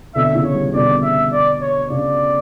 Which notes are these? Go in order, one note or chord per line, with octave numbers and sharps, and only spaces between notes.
B2 D3 E5
C#3 E3
C#5
E3 G3
B2 D3 D5
E5
D5
C#5
C#3 D5